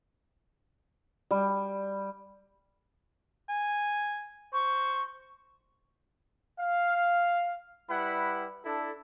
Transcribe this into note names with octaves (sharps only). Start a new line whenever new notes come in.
G3
G#5
C5 C#6
F5
G3 E4 B4 F#5 B5
D4 E4 A4